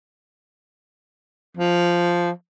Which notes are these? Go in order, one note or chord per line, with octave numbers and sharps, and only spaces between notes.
F3